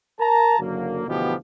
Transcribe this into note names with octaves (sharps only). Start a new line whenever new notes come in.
A#4 A5 A#5
F#1 D3 F#3 A#3
D2 B2 E3 F3 B3 G4